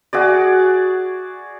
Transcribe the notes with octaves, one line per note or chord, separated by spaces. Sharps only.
F#4 G#4 D5